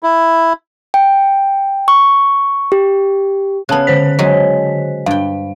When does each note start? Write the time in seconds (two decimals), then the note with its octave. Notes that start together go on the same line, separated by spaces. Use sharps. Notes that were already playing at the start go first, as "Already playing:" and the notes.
0.03 E4
0.94 G5
1.88 C#6
2.72 G4
3.69 C#3 B3 A5 F#6
3.87 D3 C5 B6
4.19 F#3 G#3
5.06 G2 F5 G5